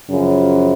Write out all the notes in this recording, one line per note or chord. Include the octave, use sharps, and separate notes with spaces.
F#2 C#3 F3